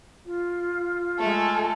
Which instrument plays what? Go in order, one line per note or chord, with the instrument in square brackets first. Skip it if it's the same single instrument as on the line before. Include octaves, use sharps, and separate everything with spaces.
[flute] F4
[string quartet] G#3 A3 [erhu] A4